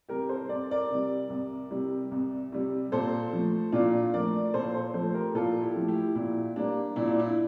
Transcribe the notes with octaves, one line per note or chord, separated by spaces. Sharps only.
C3 G3 G4 A#4
A4 C5
C2 D5
A#4 D5
C3 G3
C2
C3 G3
C2
C3 G3
A#2 A4 C5
F3 A3
A#2 D4 F4
F3 A3 A#4 D5
A#2 A4 C5
A4 C5
F3 A3 A4 C5
G4 A#4
A#2 F4 A4
E4 G4
F3 A3
E4 G4
A#2 E4
G3 A#3 D4
A#2 E4
D4
E4